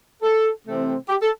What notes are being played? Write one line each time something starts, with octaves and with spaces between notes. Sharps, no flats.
A4
C3 E3 A3 C4
G4
A4